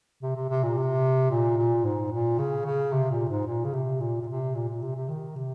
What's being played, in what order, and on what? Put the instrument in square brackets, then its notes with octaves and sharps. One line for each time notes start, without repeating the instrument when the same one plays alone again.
[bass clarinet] C3
C3
C3
A#2
C3
A#2
A#2
G#2
A#2
C#3
C#3
C3
A#2
G#2
A#2
C#3
C3
A#2
A#2
C3
A#2
A#2
C3
C3
D#3
C3